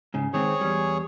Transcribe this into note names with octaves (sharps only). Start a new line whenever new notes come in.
G#2 C#3
D#3 G#3 C4 G#4 C#5
E2 G3